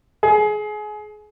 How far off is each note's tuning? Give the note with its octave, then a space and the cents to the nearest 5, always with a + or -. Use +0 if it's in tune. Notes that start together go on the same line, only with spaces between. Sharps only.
G#4 +25